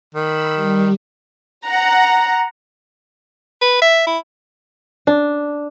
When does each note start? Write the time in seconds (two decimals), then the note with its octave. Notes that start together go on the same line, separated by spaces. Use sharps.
0.14 D#3 B5 E6
0.55 G3
1.65 F#5 A#5
3.61 B4
3.82 E5
4.07 E4
5.07 D4